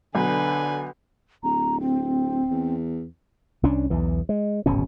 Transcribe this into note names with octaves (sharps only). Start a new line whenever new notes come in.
B1 D3 B4 G#5
D1 A#5
C4
E2
C2 C#4 D4
B1 E2 E3
G#3
D1 G#1 B2 C#4